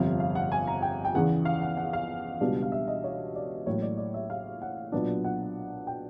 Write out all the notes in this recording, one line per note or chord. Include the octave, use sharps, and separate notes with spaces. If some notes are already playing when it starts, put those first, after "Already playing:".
Already playing: G1 F2 C3 F5
F5
F#5
G#5
A#5
G5
G5
E2 C#3 E3 F#5
F5
F#5
F#5
F5
C#2 B2 G3 B3 D4
F5
E5
D#5
C#5
D5
A1 A2 F#3 A#3 C#5
D5
D5
E5
F5
F#5
B1 A#2 F#3 B3 D4
F#5
G5